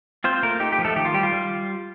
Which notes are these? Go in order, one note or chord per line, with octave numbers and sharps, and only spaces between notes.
C4 F4 C5
A3 A#3 A#4
D#4 G4
G4
F3
A3 A4
D#3 G4
F4
G3 G4
F4
G3